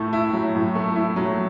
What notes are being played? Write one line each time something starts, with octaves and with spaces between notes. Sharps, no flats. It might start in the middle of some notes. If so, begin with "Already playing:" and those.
Already playing: A2 A3
E4
F#3
A2
A3
E4
F#3